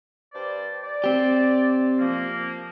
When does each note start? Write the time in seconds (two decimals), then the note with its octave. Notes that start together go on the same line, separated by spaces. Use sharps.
0.33 G2 C5 D5
0.82 D5
1.04 C4 G4
1.99 F3 A#3